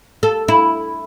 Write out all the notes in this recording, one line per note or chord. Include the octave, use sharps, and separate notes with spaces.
A4
E4